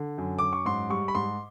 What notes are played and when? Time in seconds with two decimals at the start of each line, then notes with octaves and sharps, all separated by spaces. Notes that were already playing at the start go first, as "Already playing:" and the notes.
Already playing: D3
0.18 F#2
0.39 F#2 D6
0.53 C#6
0.66 G#2 C6
0.90 G3 C#6
1.08 B5
1.15 G#2 C6